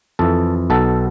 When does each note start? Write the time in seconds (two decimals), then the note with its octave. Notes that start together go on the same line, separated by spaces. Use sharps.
0.19 F2 E3 A4
0.70 B1 B2 A4